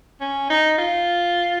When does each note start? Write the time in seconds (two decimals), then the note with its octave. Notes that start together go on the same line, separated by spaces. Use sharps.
0.21 C#4
0.50 D#4
0.78 F4